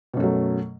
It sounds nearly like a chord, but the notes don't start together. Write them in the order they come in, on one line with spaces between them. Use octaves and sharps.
B2 F#2 A3 F#3